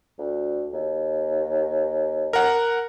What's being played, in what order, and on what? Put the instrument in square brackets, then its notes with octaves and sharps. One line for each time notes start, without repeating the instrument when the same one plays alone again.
[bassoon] D2
D#2
[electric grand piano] A#4 F#5